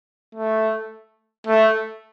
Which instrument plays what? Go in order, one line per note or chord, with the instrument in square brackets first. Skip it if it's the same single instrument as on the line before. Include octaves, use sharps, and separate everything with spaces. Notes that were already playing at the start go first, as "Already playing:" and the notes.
[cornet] A3
A3